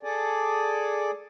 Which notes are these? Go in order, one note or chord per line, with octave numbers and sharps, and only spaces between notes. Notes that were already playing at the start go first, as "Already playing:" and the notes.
G#4 A4 D5